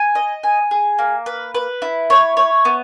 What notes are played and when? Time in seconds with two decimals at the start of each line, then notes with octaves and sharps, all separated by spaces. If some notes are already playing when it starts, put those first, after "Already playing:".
Already playing: G#5
0.15 D#5
0.43 G#5
0.71 G#4
0.99 A#3
1.26 B4
1.55 B4
1.82 E4
2.10 C#5
2.37 C#5
2.65 B3